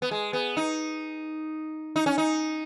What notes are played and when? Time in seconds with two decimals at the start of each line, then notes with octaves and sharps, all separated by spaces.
0.02 B3
0.11 G#3
0.33 B3
0.57 D#4
1.96 D#4
2.06 C#4
2.18 D#4